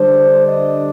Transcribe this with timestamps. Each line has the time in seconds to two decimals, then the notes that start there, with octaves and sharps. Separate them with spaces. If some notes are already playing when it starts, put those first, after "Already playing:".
Already playing: D3 G3 D4 C5
0.48 D#5